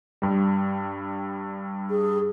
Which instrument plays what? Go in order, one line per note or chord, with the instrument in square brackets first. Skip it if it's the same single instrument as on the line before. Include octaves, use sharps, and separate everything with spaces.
[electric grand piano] G2 G3
[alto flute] G#4